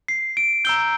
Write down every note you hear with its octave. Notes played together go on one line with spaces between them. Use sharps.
C7
D7
A#5 E6 G6 G7